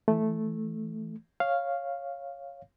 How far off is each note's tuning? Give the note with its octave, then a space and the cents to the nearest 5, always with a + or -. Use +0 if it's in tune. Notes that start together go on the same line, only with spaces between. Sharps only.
E3 +0 A3 -5
C#5 -5 F5 +0